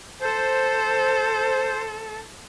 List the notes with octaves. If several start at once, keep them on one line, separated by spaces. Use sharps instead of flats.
A4 C5